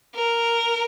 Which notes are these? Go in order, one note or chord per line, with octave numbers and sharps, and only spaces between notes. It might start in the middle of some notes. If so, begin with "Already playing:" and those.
A#4